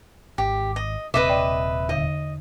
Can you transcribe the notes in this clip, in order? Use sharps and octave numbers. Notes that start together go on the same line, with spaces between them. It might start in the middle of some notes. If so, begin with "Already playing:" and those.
G#1 G4
D#5
D#1 C3 B4 D#5 E5 D6
D5 G5
E2 D3 D#5